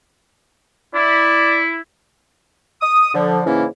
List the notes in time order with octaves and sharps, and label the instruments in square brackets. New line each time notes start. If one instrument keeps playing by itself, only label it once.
[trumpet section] E4 [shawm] D5
[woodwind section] D#6
D3 F3
G#2 C#3 E3 A#3 C#4 E4